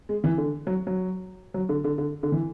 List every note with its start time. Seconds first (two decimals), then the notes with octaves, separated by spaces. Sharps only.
0.09 G#3
0.24 E3
0.38 D3
0.67 F#3
0.87 F#3
1.54 F#3
1.69 D3
1.84 D3
1.98 D3
2.23 D3
2.32 E3